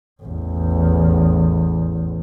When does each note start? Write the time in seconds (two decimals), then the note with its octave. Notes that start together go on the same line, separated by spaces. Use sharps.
0.23 A1 E2